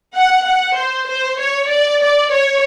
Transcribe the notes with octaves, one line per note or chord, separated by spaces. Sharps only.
F#5
F#5
C5
C5
C#5
D5
D5
C#5